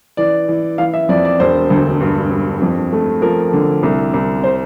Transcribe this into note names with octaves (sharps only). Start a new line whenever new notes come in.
E3 D5
E3
E3 F5
E5
F2 D5
D5
E1 C5
D2
G2
G2
F2
A3
F3 A#4
D3
C2
C2
C5